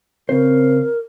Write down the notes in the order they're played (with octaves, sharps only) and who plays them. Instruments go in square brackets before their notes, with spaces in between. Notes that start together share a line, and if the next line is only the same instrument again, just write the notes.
[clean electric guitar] C#3 C5 [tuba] C4 [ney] A#4